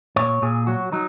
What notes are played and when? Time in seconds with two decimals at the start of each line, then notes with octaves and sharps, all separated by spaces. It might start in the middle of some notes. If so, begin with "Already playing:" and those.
0.16 A#2 C#5
0.42 A#2 G#4
0.67 F#3 F#4
0.92 F#3 D#4